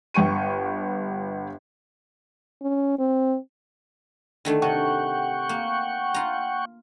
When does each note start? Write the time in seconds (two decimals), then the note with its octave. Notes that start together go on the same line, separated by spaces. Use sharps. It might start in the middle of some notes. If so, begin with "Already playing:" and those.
0.14 G1 G5 C#6 D#7
2.62 C#4
2.99 C4
4.45 D3 D#3 A3
4.62 C3 F#5 G5 C#6
5.49 A#3
6.14 F4 A#5